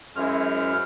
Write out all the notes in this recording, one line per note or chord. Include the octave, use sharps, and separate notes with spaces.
F#2 G#3 E4 C5 F6